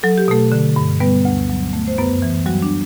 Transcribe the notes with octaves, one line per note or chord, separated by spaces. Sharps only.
F#3 A4
G4
B2 A3 A4
D3
G2
G3 B3 B4
D2
F#3
A3
C5
F#2 B3 B4
E3
F#3 G3 F#4
D4